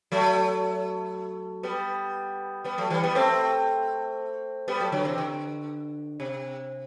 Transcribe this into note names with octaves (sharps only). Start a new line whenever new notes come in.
F#3 A3
G3 B3
G3 B3
F#3 A3
E3 G3
G3 B3
A3 C4
G3 B3
F#3 A3
D3 F#3
C3 E3
D3
C3